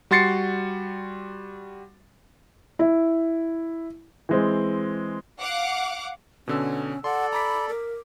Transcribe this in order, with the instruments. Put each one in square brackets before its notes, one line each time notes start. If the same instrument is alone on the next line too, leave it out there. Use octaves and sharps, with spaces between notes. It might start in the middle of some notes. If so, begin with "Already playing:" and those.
[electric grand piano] G3 F#4 C6 A6 C7 C#7
[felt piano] E4
[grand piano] E3 G#3 C4
[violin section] F5 F#5 D6
[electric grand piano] B2 D3 E6 [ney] C#4
[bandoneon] A4 D5 [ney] F#5 [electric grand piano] C6
[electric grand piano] A#5 D6 B6 [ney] B5
[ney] A#4